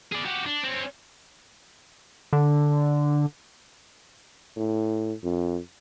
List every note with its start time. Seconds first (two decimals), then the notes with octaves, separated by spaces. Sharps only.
0.12 G#4 D5
0.25 F#4 G4
0.46 D4
0.64 C4 C#4
2.33 D3
4.57 A2
5.23 F2